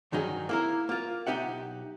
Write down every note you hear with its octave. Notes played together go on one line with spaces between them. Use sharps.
G2 D#3 F#3 D#4 G#4
A#3 E4 A#4
A#3 F4
B1 D#4 G4 E5 F#5